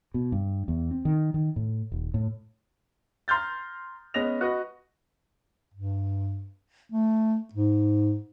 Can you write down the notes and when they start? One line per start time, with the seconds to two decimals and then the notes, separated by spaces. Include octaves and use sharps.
0.14 B2
0.32 G2
0.68 E2
0.91 C4
1.05 D#3
1.34 D#3
1.56 A2
1.92 D#1
2.14 A2
3.28 A#5 C6 F6 G6 A6
4.14 G#3 B3 C#4 D#5 A#6 F7
4.41 F#4 B4 D#5
5.74 G2
6.92 A3
7.53 G#2